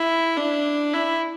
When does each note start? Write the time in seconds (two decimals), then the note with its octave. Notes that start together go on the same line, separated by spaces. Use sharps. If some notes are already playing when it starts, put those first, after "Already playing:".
Already playing: E4
0.37 D4
0.93 E4